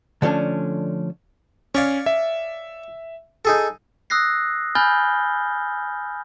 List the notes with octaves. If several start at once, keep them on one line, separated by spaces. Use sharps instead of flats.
D3 F3 A3 C#4 D4
C#4 C#5 D5 F5
E5
D#4 G#4 A4
D#6 E6 F#6 A#6 C7
G#5 B5 F6 G6 A6 G7